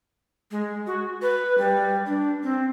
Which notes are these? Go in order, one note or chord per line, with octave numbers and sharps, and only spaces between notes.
G#3
F#4
B4
G3
D4
C4